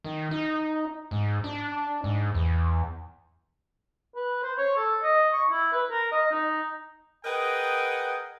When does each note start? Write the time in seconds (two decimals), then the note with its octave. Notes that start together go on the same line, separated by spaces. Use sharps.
0.04 D#3
0.31 D#4
1.11 G#2
1.44 D4
2.04 G#2
2.34 E2
4.16 B4
4.43 C5
4.58 C#5
4.76 A4
5.03 D#5
5.33 C#6
5.51 E4
5.73 B4
5.90 A#4
6.12 D#5
6.31 D#4
7.24 G#4 A#4 B4 D#5 F#5 G5